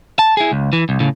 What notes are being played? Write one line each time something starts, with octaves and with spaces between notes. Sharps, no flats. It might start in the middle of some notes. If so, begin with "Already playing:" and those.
A5
E4 G#4
C#2
E3
C2
A2 C#3